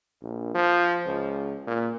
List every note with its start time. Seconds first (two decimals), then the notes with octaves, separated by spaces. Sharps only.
0.22 A#1
0.54 F3
1.07 C#2
1.67 A#2